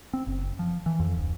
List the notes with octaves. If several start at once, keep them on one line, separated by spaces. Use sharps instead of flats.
C4
F#1
F3
E3
F2
D1